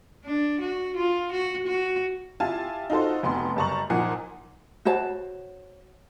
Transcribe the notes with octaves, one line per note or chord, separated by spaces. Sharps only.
D4
F#4
F4
F#4
F#4
E4 F4 G4 F5 G#5 A5
D#4 F4 F#4 A4 C5
F1 B3 C6
F#1 G3 A5 A#5 C#6 F#7
A#2 F3 D#4 F#5 G#5 A#5
F#4 C5 C#5 A5